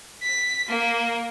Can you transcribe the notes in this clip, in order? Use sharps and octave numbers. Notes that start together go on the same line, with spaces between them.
B6
A#3